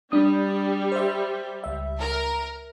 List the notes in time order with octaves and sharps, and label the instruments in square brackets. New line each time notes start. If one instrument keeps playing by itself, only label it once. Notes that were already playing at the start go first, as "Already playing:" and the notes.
[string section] G3 [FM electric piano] D4 D#6
[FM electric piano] C5 E5
C#2 E5
[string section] A#4